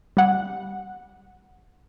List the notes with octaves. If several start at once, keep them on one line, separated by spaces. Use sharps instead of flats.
G3 F#5